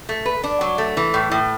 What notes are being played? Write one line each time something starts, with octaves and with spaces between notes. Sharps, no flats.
A3
B4
D4
F#3
A3
E3
A2
A2